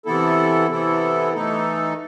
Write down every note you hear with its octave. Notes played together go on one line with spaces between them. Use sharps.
C3 E3 B3 E4 A4
C3 E3 B3 E4 A4
E3 A3 D#4 A4